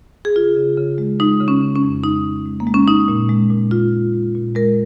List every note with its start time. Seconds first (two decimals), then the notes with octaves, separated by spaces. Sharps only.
0.25 G#4
0.36 C#3 F4
0.57 C#3
0.78 C#3
0.98 G#3
1.20 G#3 D#4
1.40 C#3
1.48 C#4
1.61 C#3
1.75 C#4
1.83 F2
2.03 G#3 D#4
2.25 G#3
2.46 G#3
2.60 A#3
2.67 G#3
2.74 C#4
2.88 G#3 D#4
3.08 A#2
3.29 G#3
3.50 A#2
3.71 G#3 F4
3.93 G#3
4.14 G#3
4.35 A#2
4.55 G#3 A#4